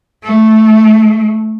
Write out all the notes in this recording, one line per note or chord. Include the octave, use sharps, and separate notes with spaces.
A3